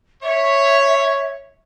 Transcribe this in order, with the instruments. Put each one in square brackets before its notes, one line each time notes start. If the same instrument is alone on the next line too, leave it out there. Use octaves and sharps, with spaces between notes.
[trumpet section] C#5 [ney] E5